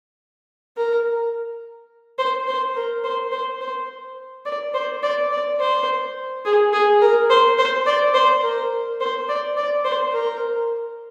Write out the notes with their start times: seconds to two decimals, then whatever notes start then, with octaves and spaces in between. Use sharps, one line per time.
0.77 A#4
2.18 C5
2.48 C5
2.76 A#4
3.04 C5
3.32 C5
3.61 C5
4.46 D5
4.74 C5
5.03 D5
5.31 D5
5.60 C5
6.45 G#4
6.73 G#4
7.01 A#4
7.30 C5
7.58 C5
7.86 D5
8.14 C5
8.43 A#4
9.00 C5
9.29 D5
9.57 D5
9.85 C5
10.13 A#4